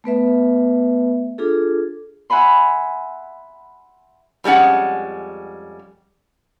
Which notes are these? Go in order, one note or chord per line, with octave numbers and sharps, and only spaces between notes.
A3 B3 B4 E5
D4 F4 G#4 A4
E5 F#5 G#5 B5 C6
F2 G3 G#3 C#4 F#5